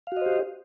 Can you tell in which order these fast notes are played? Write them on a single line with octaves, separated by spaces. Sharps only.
F5 F#4 D#5 C5 G4